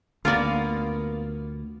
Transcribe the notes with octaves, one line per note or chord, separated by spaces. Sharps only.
D2 A#3 B3 F4 A#4 D5